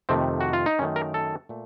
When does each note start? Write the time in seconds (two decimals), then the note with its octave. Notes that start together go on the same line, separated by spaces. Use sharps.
0.09 F2 C3 D#3 A3 C4
0.41 F#4
0.53 F4
0.66 D#4
0.79 F#2 D#3 A3 C#4
0.96 A#4
1.14 A4
1.49 A#2 A3